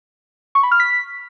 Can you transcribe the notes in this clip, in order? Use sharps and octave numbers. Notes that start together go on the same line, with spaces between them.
C#6
B5
F6
B6